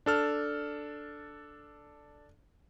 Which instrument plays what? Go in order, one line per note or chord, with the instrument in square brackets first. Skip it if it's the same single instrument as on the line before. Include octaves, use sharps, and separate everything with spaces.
[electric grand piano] D4 A4 F6